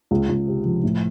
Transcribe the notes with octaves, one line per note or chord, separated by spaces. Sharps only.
C#2
C#2
C3
F3
A2